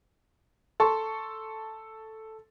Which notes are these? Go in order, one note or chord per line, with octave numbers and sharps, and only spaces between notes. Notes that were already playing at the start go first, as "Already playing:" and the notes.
A4 A5 C6 C#6